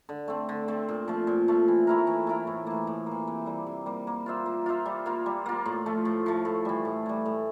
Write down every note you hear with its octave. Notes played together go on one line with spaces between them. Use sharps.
D3
A3 C4
D3
A3 C4
A#2
F3 A3
A#2
F3 A3
E3
A3 E4 A#4
E3
A3 E4 A#4
A2
E3 A#3
A2
E3 A#3
C3
G3 A#3
C3
G3 A#3
A#3
F4 C5 E5
A#3
F4 C5 E5
G3
A#3 F4
G3
A#3 F4
A2
F3 A3
A2
F3 A3
A2
E3 G3
A2
E3 G3
A2